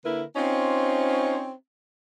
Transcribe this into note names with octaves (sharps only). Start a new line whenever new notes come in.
D3 A#3 E4 A#4 B4
C4 C#4 D#4 F4 C5 C#5